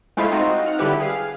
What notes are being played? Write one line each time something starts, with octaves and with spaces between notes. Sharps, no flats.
G#3 A3 E4 F4 C5
C4 D#4 F4 F#4
F#5 F6
D3 G3 E4 G4 B4
G#4 F5